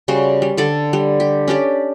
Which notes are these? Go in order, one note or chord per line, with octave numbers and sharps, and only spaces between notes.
C#3 G3 F#4 C5
G3
D3 A4 D5
G3
G4
C#4 D4 G4 D5